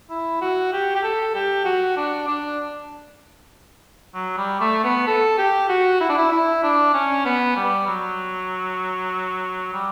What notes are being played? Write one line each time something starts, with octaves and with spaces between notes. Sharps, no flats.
E4
F#4
G4
G4
A4
G4
F#4
D4
D4
F#3
G3
A3
B3
A4
G4
F#4
E4
D4
E4
E4
D4
C#4
B3
G3
F#3
G3